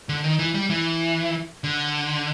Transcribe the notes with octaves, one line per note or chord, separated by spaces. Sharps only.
D3
D#3
E3
G3
E3
D3